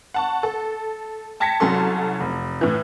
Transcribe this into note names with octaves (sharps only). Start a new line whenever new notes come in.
F#5 A5 C#6
A4
G5 A5 G#6 A#6 B6 C#7
C2 F#3 C#4 A4 C6
F1
A2 E3